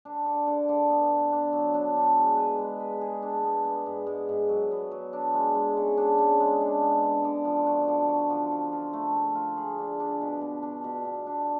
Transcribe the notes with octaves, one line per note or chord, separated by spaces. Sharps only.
D4
D3
D3
D3
B3
B3
D4
F#3
D4
D4
G#3
B4
G#3
B4
G#4
D4
B3
B3
G#2
G#2
G#2
F#3
B3
F#3
D4
G#3
G#3
C#3
D4
C#3
G#3
D4
B3
D3
D3
F3
F#4
D3
F#4
F3
F4
F4
A3
A3
F4
G#4
D4
D4
B2
B2
D4
B2
B2
D4